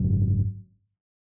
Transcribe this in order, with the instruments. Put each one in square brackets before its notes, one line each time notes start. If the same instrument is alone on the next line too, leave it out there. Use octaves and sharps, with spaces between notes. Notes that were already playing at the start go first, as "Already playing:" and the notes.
Already playing: [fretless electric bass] G#1 F#2 C#3